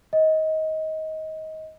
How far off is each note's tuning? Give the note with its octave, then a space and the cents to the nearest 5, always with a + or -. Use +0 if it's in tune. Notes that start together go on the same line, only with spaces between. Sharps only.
D#5 +20